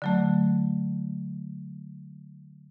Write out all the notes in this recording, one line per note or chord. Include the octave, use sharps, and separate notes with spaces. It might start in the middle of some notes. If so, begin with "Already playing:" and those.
D3 F#3 A3